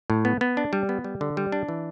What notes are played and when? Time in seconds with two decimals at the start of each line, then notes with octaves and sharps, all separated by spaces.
0.10 A2
0.25 B3
0.41 B3
0.57 D4
0.73 G3
0.89 B3
1.04 G3
1.21 D3
1.37 G3
1.52 D4
1.69 E3